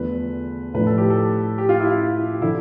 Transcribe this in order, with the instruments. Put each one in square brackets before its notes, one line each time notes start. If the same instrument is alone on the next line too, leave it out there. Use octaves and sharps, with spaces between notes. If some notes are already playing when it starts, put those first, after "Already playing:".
Already playing: [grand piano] E2 D3 F3 A3 [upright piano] B4
[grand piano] A2 F3 A3 D4 [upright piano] B4
[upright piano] A4
G4
A4
G4
F4
E4
F4
[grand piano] D3 F3 [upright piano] E4